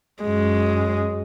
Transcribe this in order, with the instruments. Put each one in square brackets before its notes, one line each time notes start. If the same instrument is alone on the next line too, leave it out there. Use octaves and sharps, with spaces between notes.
[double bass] F#2 [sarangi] G#3